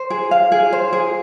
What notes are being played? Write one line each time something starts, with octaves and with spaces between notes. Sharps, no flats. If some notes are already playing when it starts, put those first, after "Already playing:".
Already playing: C5
G#4
F5
G#4
C5
G#4